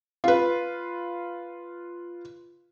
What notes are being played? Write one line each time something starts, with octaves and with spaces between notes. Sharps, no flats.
F4 B4